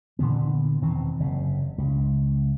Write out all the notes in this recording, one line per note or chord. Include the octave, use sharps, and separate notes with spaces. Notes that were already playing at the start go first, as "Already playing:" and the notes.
A#2 D3 E3 B3
E1 D#3 E3 C4
F#1 C3
C#2